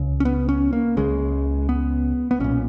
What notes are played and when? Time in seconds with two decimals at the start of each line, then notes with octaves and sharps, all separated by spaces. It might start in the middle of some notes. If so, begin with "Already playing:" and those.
Already playing: C#2 C#3
0.20 C#4
0.25 B3
0.49 C#4
0.73 A#3
0.97 C#2 C#3 G#3
1.69 B3
2.31 B3
2.40 B1 A#2 C#4